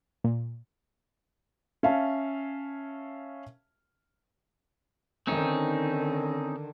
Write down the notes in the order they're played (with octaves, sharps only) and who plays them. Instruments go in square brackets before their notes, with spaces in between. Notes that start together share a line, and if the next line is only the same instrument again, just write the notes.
[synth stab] A#2
[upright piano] C#4 C#5 E5 F5 A5
[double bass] D3 D#3 [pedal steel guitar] C4 C#4 D#4